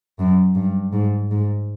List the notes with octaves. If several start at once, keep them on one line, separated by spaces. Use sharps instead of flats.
F#2
G2
G#2
G#2